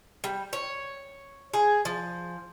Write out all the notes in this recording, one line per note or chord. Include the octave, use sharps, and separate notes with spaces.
G3
C#5
G#4
F3